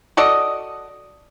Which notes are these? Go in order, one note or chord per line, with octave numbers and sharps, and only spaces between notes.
F#4 A4 D5 D#5